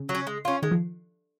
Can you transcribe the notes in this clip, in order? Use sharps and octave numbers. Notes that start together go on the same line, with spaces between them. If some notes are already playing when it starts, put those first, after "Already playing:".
Already playing: C#3
F#3
C#4
G#3
C#4 F4
D#3 G#3
F3